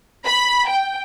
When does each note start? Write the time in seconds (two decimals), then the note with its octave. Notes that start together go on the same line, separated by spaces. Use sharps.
0.25 B5
0.68 G5